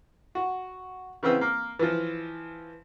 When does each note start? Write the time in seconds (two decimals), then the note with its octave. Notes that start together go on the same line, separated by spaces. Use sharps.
0.35 F#4
1.23 C#3 E3 B3 C4 E6
1.41 A#3
1.79 E3 F3